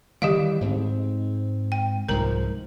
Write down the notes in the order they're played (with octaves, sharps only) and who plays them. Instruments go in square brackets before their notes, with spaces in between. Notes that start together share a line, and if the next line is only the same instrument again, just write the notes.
[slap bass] D#3 E3 G3 [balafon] G4 D#5 F5
[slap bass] G#2 C4
[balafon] G5
[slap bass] C2 G#2 F3 [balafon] A#4 A#5